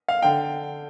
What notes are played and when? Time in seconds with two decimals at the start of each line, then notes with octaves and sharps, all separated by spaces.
0.08 F5
0.22 D3 G5